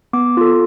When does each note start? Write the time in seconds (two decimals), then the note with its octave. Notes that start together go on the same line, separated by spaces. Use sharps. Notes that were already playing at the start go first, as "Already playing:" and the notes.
0.13 B3 D6
0.37 F4 A4